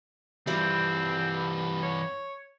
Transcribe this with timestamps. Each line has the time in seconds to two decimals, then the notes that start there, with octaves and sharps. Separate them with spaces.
0.47 G2 E3 F3 G3 C4
1.83 C#5